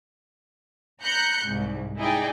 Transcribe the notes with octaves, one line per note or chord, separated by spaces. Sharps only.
A#5 B5 F#6 G6 C#7
C2 G#2
D#4 E4 G#4 D5 D#5 G5